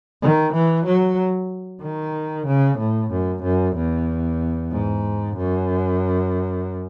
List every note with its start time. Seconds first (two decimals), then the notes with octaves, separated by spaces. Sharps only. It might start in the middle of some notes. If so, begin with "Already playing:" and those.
0.22 D#3
0.53 E3
0.86 F#3
1.82 D#3
2.47 C#3
2.79 A2
3.11 F#2
3.43 F#2
3.76 E2
4.72 G#2
5.37 F#2